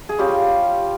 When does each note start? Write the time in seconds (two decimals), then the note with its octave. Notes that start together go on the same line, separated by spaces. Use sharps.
0.09 G#4
0.18 G3 C#4 F4 G4